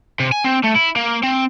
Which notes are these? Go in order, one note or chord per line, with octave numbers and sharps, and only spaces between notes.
C3
G#5
C4
A3
E4
A#3
C4